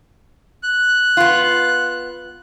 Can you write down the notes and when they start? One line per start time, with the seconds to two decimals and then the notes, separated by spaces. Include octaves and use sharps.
0.63 F#6
1.17 B3 F4